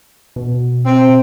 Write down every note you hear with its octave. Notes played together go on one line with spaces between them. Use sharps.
B2
C4